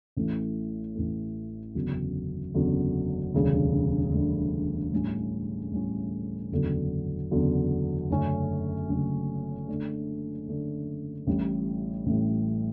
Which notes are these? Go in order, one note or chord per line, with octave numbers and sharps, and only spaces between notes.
A1 A2 E3 A3
A1 A2 E3 A3
F#1 E2 D3 F#3
F#1 E2 D3 F#3
E1 D2 C#3 G3 D4
E1 D2 C#3 G3 D4
A2 G3 C#4
A2 G3 C#4
F#1 E2 D3 F#3
F#1 E2 D3 F#3
F#1 F#2 D3 A3 C#4
F#1 F#2 D3 A3 C#4
D3 A3 D4
D3 A3 D4
A1 A2 G3
A1 A2 G3